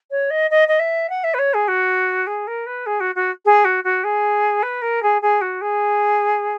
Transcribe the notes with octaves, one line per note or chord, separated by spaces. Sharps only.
C#5
D#5
D#5
D#5
E5
F#5
E5
B4
C#5
G#4
F#4
G#4
A#4
B4
G#4
F#4
F#4
G#4
F#4
F#4
G#4
B4
A#4
G#4
G#4
F#4
G#4